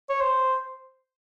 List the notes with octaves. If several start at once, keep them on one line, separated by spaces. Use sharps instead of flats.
C#5
C5